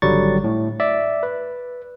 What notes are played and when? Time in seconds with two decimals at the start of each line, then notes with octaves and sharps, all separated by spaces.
0.02 G#1 D3 F#3 G3 C#6 A6
0.44 A2
0.80 D5 E5
1.23 B4